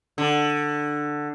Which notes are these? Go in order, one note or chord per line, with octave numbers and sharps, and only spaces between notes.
D3